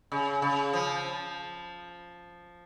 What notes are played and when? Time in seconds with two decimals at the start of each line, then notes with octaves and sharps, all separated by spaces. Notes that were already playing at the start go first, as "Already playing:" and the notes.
0.12 C#3
0.42 C#3
0.73 F3